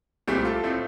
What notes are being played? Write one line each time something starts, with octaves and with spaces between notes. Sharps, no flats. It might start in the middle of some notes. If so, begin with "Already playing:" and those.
C2 A#2 A3 C4 G4
F4 A4
A2 A3 C4